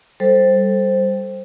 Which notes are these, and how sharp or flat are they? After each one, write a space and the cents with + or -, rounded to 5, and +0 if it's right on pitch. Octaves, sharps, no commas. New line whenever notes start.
G3 +0 A4 +0 C5 +5